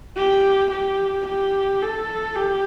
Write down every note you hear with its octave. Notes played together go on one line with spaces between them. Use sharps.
G4
G4
G4
A4
G4